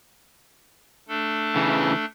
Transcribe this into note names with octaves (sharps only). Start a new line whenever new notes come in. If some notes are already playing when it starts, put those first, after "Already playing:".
A3 D4 A4
C#3 E3